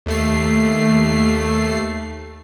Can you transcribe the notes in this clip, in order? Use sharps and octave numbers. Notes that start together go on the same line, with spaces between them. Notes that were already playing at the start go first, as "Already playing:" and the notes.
D#2 A3 C7